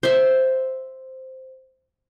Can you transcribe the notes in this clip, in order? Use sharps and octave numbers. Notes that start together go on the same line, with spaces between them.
C5 E5